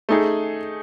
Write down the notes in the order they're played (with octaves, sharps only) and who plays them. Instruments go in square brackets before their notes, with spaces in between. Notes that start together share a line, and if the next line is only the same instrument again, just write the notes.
[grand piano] A3 D#4 G#4